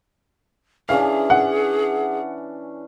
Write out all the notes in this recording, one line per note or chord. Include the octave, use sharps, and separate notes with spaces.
E3 C#4 D4 G#4 F5
F#5